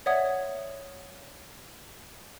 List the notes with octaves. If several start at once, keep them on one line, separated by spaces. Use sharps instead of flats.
C#5 D5 E5 F#5 D#6 G#6